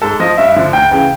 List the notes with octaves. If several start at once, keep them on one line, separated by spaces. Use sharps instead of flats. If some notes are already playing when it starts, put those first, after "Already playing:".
G#2 A4
F3 D#5
G2 E5
D3 F3
D2 G5
C#3 E3 G5